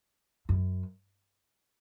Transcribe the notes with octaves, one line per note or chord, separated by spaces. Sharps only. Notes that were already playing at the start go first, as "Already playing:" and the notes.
F#2